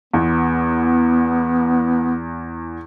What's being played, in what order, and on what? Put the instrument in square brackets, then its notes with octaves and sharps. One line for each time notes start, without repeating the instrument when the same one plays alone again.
[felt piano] E2 [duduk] B3